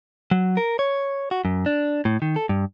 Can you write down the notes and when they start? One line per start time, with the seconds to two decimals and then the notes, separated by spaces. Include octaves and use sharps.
0.31 F#3
0.57 A#4
0.79 C#5
1.31 F#4
1.45 F#2
1.66 D4
2.05 A2
2.22 D#3
2.36 A4
2.49 G2